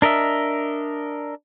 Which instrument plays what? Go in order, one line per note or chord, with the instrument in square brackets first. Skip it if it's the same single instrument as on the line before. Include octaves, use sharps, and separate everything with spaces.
[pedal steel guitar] D4 A#4 D#5 E5